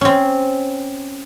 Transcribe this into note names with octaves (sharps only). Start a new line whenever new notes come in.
C4 C#4